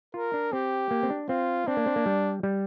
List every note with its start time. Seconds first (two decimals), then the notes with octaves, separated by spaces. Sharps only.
0.14 F4 A#4
0.34 D4
0.52 C4 G4
0.91 A#3
1.03 C4
1.10 D4
1.29 C4 F4
1.67 C4 D4
1.77 A#3
1.86 C4
1.96 A#3
2.06 G3
2.43 G3